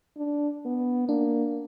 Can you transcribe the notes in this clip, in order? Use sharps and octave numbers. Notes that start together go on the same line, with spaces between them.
D4
B3
A#3 D4